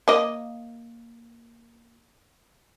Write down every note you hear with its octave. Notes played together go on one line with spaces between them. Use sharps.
A#3 D#5